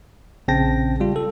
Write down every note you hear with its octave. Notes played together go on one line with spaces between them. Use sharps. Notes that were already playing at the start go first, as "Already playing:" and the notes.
A#1 C#3 C4 G5 A5 A#6
G3 F4
A4